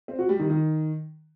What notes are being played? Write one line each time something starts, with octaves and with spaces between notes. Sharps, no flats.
C4
F#4
G3
D#3
D#3